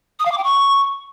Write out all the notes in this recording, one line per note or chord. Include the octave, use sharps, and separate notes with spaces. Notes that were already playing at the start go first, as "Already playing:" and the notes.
D#6
F5
D6
G5
C#6